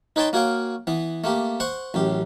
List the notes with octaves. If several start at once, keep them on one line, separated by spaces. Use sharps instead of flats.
D#4 B4 C#5 G5 A5 C6
A#3 F#4 C#5 F5 G5
E3 B3
A3 A#3 G4
C5 F#5 C#6
A1 F#2 G4